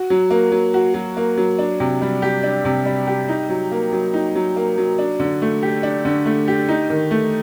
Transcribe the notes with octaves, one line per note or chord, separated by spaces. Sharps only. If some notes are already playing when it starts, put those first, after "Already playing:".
Already playing: F#4
F#3
A#3
F#3
F#4
F#3
A#3
F#3
D4
C3
G3
G4
D4
C3
G3
G4
D#4
F#3
A#3
F#3
D#4
F#3
A#3
F#3
D4
D3
A3
G4
D4
D3
A3
G4
D#4
D#3
A3